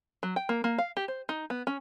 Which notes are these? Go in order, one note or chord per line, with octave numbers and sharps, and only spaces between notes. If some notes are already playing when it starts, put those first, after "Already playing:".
F#3
G5
A#3
A#3
F5
G4
C5
D#4
B3
C#4